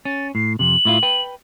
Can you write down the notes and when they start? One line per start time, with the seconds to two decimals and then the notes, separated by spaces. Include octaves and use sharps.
0.05 C#4 A6
0.35 A2 C7
0.59 F2 C3 F#7
0.85 A2 E4 F4
1.03 B4 G5